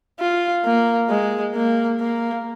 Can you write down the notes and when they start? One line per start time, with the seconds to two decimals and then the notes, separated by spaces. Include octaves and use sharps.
0.20 F4
0.65 A#3
1.09 G#3
1.56 A#3
2.00 A#3